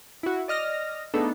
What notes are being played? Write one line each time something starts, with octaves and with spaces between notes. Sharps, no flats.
E4 F#4
D5 D#5 F6 A#6
A3 B3 D4 D#4 G#4 A4